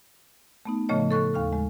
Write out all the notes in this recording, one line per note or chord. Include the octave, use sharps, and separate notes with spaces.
A3 B3 D#4
A2 C#3 F3 A3 C#5 D#5
A4 C#6 F#6
D#2 F5 C#6 F6
G#3